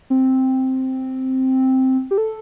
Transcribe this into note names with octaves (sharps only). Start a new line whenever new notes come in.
C4
G4
A4